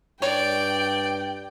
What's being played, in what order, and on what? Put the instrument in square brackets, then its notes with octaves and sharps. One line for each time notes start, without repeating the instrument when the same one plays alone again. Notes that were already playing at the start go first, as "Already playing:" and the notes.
[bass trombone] G2 [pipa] C#5 [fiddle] D5 [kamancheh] G5